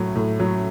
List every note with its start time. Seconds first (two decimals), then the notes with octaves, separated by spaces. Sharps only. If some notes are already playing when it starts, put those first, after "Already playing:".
Already playing: A2 F#3
0.15 A2
0.40 F#3